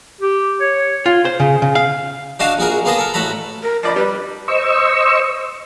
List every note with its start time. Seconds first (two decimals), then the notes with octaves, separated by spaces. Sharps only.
0.21 G4
0.60 C#5
1.06 F4
1.25 C5
1.40 C#3
1.62 C#3
1.75 F5
2.39 D4 D#4 F#4 D#5 F5 A5
2.58 A#1 F#4 G#4 A#4
2.85 A#3 B3 G#4 A4 A5 A#5
2.98 A4 A#4
3.14 A1 F#4 A4 A#5 B5
3.63 A#4
3.83 F3 D5 D#5 B5
3.96 G3 B4
4.48 C5 D#5 C#6 E6